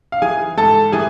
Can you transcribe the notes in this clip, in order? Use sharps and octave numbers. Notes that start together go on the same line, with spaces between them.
F5
E3 G#4 G#5
G#2 A4 A5
E3 G#4 G#5